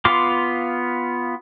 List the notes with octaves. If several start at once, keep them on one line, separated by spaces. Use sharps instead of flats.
B3 F4 F5 C6 D6